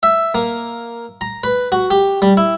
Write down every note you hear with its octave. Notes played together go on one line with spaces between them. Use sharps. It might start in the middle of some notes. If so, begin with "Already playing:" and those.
E5
A#3
A#5
B4
F#4
G4
G3
E4